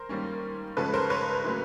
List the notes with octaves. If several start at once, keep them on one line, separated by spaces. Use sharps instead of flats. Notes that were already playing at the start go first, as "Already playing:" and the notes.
Already playing: A#4 C5
D#3 G3 A#3 C#4
C#3 F3 G#3 C#4 A4 B4
A#4 C5
B4 C#5
A2 F#3 A#3 C#4